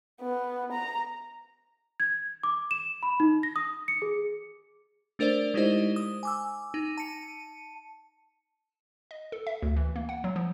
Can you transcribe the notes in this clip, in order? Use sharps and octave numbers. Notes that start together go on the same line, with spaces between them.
B3
A#5
G#6
D6
E7
B5
D#4
A#6
D#6
C#7
G#4
A3 D4 A#4 C5 D5
G#3 D#4 E4 G4 C5 D#5
D#6
G#5 D6 E6
D#4
A5 C#7 D#7
D#5
A4
E5
D2
E3
A#3
F#5
F#3
F3